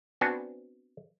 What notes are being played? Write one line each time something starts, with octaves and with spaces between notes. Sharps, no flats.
B3 C4 D4 F#4 G#5 A5